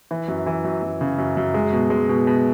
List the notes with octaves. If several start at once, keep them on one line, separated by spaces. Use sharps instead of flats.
E3
F#2
E3
F#2
F#2
C#3
F#2
F#2
G#3
B2
G#3
B2
B2